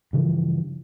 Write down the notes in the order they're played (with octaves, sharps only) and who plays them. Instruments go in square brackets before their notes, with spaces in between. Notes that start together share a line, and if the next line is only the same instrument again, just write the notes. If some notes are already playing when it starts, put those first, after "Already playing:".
[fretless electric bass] G2 C#3 E3 F3